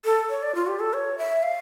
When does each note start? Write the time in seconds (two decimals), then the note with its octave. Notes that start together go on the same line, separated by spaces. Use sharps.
0.05 A4
0.30 C#5
0.43 D5
0.55 F4
0.67 G4
0.80 A4
0.93 C#5
1.18 E5
1.43 F5